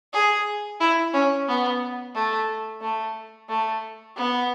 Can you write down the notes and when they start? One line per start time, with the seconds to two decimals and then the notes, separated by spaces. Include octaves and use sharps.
0.13 G#4
0.81 E4
1.14 C#4
1.48 B3
2.15 A3
2.82 A3
3.49 A3
4.16 B3